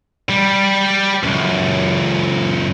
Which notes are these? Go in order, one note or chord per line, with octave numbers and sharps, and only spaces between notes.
G3
C#2 F#2